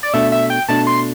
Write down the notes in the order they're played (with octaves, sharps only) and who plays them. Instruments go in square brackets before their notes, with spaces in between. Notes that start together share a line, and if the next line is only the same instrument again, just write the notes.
[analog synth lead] D5
[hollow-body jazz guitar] B2 A3 D4 [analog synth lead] E5
[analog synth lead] E5
G5
[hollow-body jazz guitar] B2 A3 D4 [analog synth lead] A5
[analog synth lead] C6